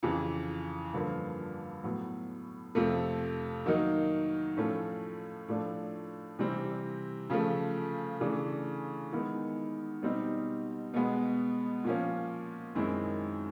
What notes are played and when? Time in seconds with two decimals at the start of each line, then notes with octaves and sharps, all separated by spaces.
0.03 F2 C#3 E3
0.93 G2 D3 F3 A#3
1.84 A2 F#3 B3
2.75 F2 C3 F3 A3
3.66 D#3 F#3 A#3 D#4
4.57 A2 F3 A3 C#4
5.48 A2 F3 A3 D4
6.39 C3 E3 G3 C4
7.30 C#3 F3 A3
8.20 C#3 E3 A3 D4
9.12 D#3 G#3 B3 E4
10.02 B2 G3 C4 D#4
10.94 B2 G#3 B3
11.84 A#2 F3 A#3 C#4
12.75 F#2 D#3 G#3 C4 E4